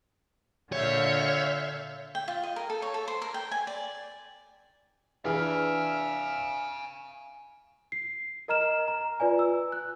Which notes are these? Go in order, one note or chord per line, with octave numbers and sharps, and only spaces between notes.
A#2 D3 C#5 E5 F5 G6
G5
F4
D#5
A#4
A4
C#5
A4
C5
A#4
G5
G#5
D5
E3 D4 G#4 E5 F5 G#5 F6
C7
A#4 D#5 A#5 F6 E7
A#5
F4 B4 D5 G#5
E6
F#6